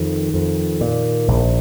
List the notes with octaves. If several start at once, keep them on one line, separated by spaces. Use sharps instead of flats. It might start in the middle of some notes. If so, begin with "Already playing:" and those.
Already playing: F2 D#3
F2
A#2
A#1